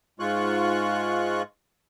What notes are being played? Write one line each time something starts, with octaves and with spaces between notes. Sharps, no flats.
G#2 G#3 F4 C#6 F#6